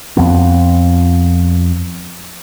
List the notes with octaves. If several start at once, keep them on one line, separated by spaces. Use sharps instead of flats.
F2 F3 B3 C4